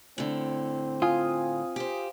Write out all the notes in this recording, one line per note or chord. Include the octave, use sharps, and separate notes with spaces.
A2 D3 C4
F4 F5 G#5 D#6
G4 C5